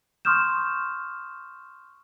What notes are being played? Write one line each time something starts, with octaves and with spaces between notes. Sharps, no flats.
C6 C#6 D#6 F6 G6 E7